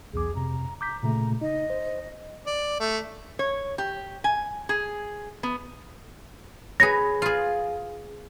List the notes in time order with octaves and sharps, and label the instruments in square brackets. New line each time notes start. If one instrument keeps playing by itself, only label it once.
[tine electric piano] B1 E2 D6 [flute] G#4
[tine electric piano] F2 C3 [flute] A#5
[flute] A#5 [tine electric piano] D6 G6 B6
[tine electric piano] A#2 C#3 A3 [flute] A#5
[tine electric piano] D#4 [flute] D#5
[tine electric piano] C5
[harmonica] D5
A3
[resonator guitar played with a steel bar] C#5
G4
G#5
G#4
B3
[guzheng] G#4 B4 C#5 [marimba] A#6
[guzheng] F4 G#4